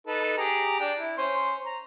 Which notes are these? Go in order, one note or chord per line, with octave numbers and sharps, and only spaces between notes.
D#4 A4 B4
G4 G#4 A#5
D4 G5
E4
C#4 C5
A#5